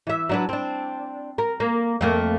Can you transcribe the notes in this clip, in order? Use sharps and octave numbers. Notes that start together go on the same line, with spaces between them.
E3 E5
F#3 D4 B4
C4 D4
A#4
A#3
F2 A3 A#3